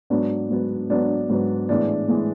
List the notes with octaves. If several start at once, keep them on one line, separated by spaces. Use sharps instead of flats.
G#2 F#3 B3 D4
G#2 F#3 B3
G#2 F#3 B3 D4
G#2 F#3 B3
A2 E3 G#3 B3 D4
A2 E3 G#3 B3